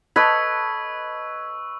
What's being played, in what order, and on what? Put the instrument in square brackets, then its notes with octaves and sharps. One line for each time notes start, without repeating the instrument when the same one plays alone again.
[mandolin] A4 C#5 [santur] B4 D#5 [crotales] C#6 E6 [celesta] G#6 B6